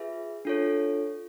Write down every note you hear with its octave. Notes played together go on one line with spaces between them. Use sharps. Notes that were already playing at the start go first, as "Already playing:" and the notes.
Already playing: F4 G#4 B4 E5
D4 F4 A4 C#5